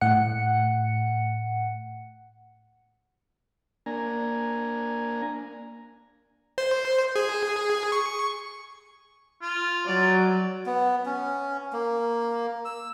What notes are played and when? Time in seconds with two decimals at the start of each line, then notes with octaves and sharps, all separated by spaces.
0.01 A2 F#5 C#7
3.86 A#3 D4 G#5 A#5
6.58 C5
7.16 G#4
7.92 C#6
9.42 F4
9.87 F#3 D5
10.66 B3
11.06 C#4
11.73 A#3
12.65 E6